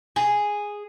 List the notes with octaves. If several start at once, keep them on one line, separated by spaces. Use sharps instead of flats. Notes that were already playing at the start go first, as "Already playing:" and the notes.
G#4